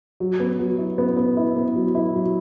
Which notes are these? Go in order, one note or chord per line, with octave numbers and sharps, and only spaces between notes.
F#3
B3
F#3
E4
B3
B3
E4
B3
F#3
E4
F#3